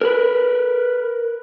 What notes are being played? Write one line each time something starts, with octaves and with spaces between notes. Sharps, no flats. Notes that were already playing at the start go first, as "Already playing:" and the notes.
A#4 B4